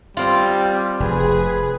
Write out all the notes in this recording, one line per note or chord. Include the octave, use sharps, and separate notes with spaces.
G3 C4 F4
F1 G#4 B4